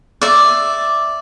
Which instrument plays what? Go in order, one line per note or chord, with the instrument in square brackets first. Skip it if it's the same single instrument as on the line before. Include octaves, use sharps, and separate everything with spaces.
[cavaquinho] D5 E5